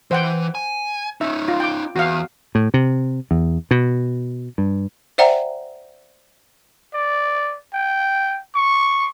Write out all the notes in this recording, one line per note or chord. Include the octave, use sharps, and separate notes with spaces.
E3 C5 F#5 G5
G#5
C#4 D#4 E5
F4
G5 D6
E2 F#4 F5
A2
C3
E2
B2
G2
C5 D5 E5 F#5 G5 A#5
D5
G5
C#6